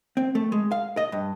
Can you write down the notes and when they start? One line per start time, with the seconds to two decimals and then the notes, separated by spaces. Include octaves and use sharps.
0.17 C4
0.35 A3
0.52 G#3
0.72 F5
0.97 D#5
1.12 G2